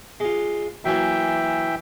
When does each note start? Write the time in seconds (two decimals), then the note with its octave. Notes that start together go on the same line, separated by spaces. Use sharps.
0.20 G#3 F4
0.85 E3 F#3 A#3 E5 G5 G#5